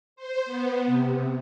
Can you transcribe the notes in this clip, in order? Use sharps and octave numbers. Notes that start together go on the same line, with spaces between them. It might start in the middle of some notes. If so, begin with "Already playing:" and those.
C5
B3
C3